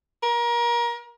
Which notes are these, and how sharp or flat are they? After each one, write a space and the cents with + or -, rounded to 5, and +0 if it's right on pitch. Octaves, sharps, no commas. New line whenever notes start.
A#4 +30